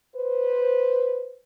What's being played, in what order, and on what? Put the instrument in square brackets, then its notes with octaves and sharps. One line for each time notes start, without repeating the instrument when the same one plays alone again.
[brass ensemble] B4 C5